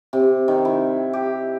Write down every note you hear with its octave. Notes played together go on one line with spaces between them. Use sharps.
C3
D#3
E4
G4